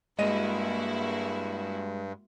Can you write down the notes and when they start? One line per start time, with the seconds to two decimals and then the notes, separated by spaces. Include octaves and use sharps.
0.19 G2 G#3 A#3 E4 F#4 D#5 D#7